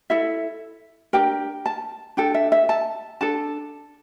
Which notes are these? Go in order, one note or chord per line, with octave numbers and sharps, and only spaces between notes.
E4 A4 E5
D4 G4 A#4 G5
A5
D4 A4 G5
E5
E5
A5
D4 A4 A5